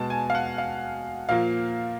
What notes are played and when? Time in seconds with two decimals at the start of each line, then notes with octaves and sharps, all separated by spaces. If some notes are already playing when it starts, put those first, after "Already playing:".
Already playing: B2 G#3 A5
0.10 G#5
0.30 F5
0.35 F#5
0.58 F5
1.29 A#2 F3 A#3 F5